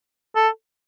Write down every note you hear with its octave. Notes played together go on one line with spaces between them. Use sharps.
A4